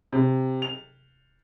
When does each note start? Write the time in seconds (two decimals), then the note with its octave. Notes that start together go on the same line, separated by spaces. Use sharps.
0.12 C3
0.62 F7